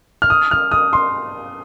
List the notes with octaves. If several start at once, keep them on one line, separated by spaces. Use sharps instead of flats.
F6
D#6
F6
D#6
C6